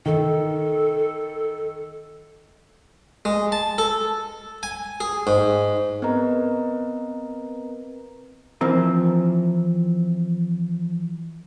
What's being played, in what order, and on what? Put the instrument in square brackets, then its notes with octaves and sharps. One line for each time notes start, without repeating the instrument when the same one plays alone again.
[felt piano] D#3 [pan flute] A4
[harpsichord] G#3
A5
A4
G#5
G#4
G#2
[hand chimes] B3 C4 A#4 B4 D#5 A#5
[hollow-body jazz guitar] E3 F3 C4 A#4